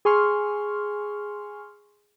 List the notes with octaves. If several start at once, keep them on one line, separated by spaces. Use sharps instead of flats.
G#4 G#5 C6 C#6 F6